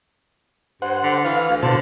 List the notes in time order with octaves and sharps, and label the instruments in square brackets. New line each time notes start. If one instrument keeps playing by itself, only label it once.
[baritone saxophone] G2 [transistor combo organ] C5 F#5
[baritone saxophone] D3
[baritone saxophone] E3 [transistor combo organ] F5
[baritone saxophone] D2
[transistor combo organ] B2 C5 A5 [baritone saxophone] D3